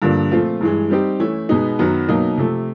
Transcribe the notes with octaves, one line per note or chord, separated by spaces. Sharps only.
G2 D3 F3 A#3 D4
A#2 F3 A3 C4 F4
G2 E3 G#3
G3 C4 D#4 G4
E3 A3 C#4 E4
B2 G#3 B3 D#4
F#2 D#3 F#3 B3
B2 F#3 A#3 D#4
C3 F3 A3